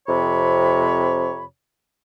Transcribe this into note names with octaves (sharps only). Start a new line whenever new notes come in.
F2 C3 C#5 B5